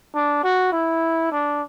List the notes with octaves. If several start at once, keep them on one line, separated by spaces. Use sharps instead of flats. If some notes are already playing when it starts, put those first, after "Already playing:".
D4
F#4
E4
D4